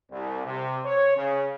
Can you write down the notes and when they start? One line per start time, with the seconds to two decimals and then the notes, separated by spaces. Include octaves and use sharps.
0.11 C2
0.45 C3
0.85 C#5
1.17 C#3